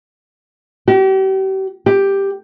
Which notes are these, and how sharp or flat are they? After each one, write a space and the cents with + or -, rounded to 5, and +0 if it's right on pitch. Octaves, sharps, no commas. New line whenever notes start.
G4 -40
G4 +5